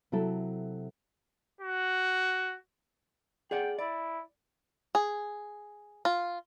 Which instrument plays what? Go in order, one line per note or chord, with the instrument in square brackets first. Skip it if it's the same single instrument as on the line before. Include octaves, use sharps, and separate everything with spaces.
[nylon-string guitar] C3 F#3 E4 A4 A5
[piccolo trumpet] F#4
[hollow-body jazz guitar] G#4 D5 F#5 [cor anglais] G5
[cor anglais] E4 [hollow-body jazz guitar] D5
[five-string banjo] G#4
F4